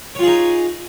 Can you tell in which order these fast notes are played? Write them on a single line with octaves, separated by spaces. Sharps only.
C#5 F4 G#4 D#4